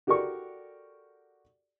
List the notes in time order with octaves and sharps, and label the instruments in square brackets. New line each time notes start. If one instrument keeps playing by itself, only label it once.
[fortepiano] F#4 G4 A4 A#4 D5 C#6